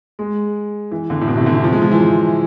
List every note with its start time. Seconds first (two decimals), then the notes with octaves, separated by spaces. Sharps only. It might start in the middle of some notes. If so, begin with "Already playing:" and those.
0.19 G#3
0.91 E3
1.10 D3
1.21 A2
1.28 B2
1.37 C3
1.41 E3
1.46 D3
1.55 E3
1.64 F3
1.73 G#3
1.82 F3
1.91 E3
2.00 F3